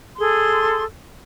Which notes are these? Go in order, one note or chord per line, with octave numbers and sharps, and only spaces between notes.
G#4 A4 C6